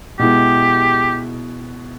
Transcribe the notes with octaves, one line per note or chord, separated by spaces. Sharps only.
B2 G#3 B3 E4 G4